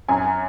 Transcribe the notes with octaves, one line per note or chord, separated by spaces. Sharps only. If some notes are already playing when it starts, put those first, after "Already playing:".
F#2 G#5